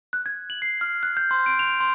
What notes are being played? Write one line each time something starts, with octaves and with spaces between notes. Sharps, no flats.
F#6
G#6
F#7
C7
F6
F#6
G6
C6
D7
F7
C6